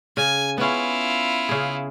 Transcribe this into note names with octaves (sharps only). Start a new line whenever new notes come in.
C#3 G#5
B3 C#4 E4 F4
C#3 G#4